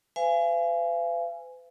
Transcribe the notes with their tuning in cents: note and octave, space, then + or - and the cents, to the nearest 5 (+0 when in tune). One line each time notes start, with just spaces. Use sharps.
B4 +45 F5 -40 G#5 +0